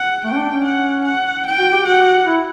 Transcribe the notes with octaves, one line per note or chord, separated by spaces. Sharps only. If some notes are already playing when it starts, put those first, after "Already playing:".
Already playing: F#5
A3 G5
C#4
D4
C#4
F#5
F#5
G5
F#4
G4
F#4 F#5
E4